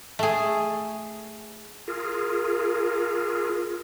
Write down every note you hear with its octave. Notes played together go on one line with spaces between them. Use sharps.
A3 G#4
F4 G#4 A#4